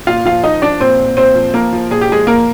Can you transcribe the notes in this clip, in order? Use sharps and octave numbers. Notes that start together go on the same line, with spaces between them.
A#2 F4 F5
F3 F4 F5
F3 D#4 D#5
F3 D4 D5
A#2 C4 C5
A#2
A#2 C4 C5
F3
F3 A#3 A#4
F3
A#2 G#4
G4
F3 G#3 G#4
A#2 A#3 A#4